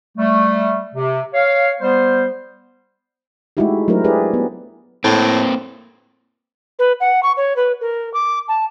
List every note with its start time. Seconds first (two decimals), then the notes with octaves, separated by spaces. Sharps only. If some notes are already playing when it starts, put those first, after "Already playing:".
0.18 G3 A3
0.95 C3
1.34 C#5 F5
1.81 G3 B3 C5
3.57 G#3 A3 D#4 E4 F#4 G4
3.88 F#3 A3 D4 E4 A#4 C5
4.04 E4 G4 G#4 B4 D5
4.34 B3
5.04 A2 A#3 C4
6.79 B4
7.00 F#5
7.23 C#6
7.37 C#5
7.56 B4
7.81 A#4
8.14 D6
8.48 A5